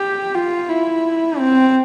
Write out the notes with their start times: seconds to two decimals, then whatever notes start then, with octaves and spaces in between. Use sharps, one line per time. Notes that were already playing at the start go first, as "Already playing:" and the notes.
Already playing: G4
0.35 F4
0.69 E4
1.38 C4